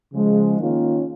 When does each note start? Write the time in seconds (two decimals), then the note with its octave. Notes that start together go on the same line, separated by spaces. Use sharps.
0.13 C#3 F3 G#3
0.58 D#3 A#3 C#4 F4